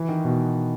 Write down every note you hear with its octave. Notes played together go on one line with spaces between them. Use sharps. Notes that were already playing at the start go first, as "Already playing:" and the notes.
Already playing: E3
D#3
B2